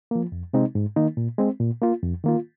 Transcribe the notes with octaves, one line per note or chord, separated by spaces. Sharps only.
F3 A#3
F2
C3 G#3 C4 D#4
G#2
D#3 A#3 D#4
A#2
G#3 C4
A#2
A#3 F4
F2
D#3 A#3 F4